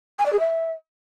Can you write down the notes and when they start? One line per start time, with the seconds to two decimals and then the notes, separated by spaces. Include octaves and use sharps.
0.19 G#5
0.26 D5
0.32 G#4
0.39 E5